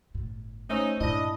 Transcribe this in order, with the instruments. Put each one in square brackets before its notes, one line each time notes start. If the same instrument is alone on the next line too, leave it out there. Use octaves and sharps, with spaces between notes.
[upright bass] G1 A2
[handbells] A3 C5 E6 [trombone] C#4 [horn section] D#4
[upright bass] G2 A#2 [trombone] D4 [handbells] E4 [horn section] D#5